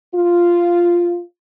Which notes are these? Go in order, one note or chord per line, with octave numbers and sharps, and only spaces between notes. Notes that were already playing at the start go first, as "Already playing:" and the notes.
F4